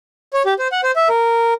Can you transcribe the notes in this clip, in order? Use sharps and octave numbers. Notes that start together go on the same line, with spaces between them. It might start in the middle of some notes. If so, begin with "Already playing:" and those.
C#5
G4
C5
F#5
C5
E5
A#4